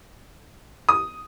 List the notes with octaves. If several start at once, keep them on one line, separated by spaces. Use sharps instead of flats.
D#6